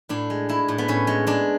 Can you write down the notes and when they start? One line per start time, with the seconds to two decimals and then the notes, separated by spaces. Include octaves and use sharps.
0.09 A2 D4
0.30 G#3
0.49 G#3 E4
0.68 A2
0.78 B3
0.88 A2 C#4
1.07 G#3
1.27 G#3 D4